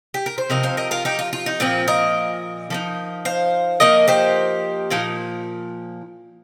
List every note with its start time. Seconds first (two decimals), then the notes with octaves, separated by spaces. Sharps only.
0.14 G4
0.26 A#4
0.38 C5
0.50 C3 F3 D#4 A#4 D#5
0.63 C5 F5
0.77 A#4 D#5
0.91 F4 A#4
1.05 D#4 G4
1.19 F4
1.33 F4
1.46 D#4
1.60 A#2 F3 C4 F4
1.88 A#4 D#5
2.70 F3 A#3 D#4
3.25 C5 F5
3.80 F3 A#3 D#4 A#4 D#5
4.08 G4 C5
4.90 A#2 F3 D#4 F4 A#4